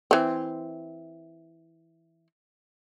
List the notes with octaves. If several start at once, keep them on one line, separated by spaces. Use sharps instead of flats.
E3 C4